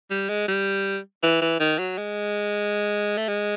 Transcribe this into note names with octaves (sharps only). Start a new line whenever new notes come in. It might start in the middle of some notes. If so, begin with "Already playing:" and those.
G3
G#3
G3
E3
E3
D#3
F#3
G#3
A3
G#3